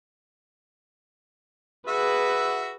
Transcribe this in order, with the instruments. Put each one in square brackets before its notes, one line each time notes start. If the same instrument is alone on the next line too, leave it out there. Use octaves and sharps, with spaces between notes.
[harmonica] F#4 E5 [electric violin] G#4 B4